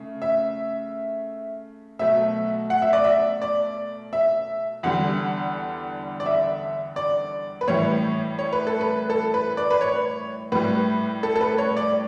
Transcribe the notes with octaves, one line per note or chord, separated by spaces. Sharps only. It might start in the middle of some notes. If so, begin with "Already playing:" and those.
Already playing: C#3 A3
E5
B2 F#3 A3 E5
F#5
E5
D5
E5
D5
E5
E2 D3 G3 F#5
D5
E5
D5
B4
A2 E3 G3 C#5
C#5
B4
A4
B4
A4
B4
D5
B4
C#5
A2 G3 B4
A4
A4
B4
C#5
D5